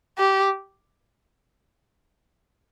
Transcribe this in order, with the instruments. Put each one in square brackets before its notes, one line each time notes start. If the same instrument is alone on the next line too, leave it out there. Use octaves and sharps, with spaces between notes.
[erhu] G4